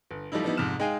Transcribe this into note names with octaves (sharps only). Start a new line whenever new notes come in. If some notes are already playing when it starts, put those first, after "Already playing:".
G1
F3 G3 A3 D#4 E4
F3 G3 B3 D#4 E4
F2 G#2 C3 F6 E7
G#3 D#4 G#4 F5 G5 G#5